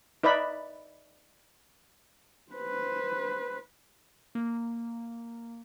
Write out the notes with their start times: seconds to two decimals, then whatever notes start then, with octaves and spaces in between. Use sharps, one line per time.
0.23 D#4 B4 D5 E5 B5
2.53 B4 C5
4.35 A#3